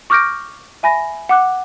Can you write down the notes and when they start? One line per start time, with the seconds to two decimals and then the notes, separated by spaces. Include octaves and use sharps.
0.10 C#6 D6 F6 G6 A#6 D7
0.83 E5 G#5 B5 A#6
1.29 F#5 D6 F#6